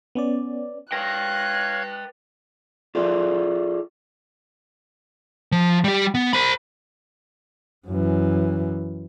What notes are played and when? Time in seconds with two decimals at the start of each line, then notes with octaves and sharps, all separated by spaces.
0.15 B3 C#4 D5
0.92 B4 C#5 F5 G5 F#6 G#6 A#6
2.95 F4 G#4 A4 D5
5.52 F3
5.84 G3 G4
6.15 B3
6.33 C5 B5
7.88 F#2 E3